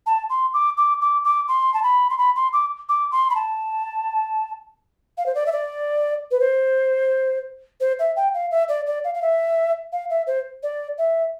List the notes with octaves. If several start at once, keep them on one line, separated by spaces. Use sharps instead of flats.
A5
C6
D6
D6
D6
D6
C6
A5
B5
C6
B5
C6
D6
D6
C6
B5
A5
F5
C5
D5
E5
D5
B4
C5
C5
E5
G5
F5
E5
D5
D5
F5
F5
E5
F5
E5
C5
D5
E5